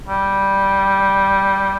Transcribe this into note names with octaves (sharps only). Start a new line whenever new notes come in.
G3